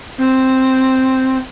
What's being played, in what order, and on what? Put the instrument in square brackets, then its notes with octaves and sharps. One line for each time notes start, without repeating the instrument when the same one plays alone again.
[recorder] C4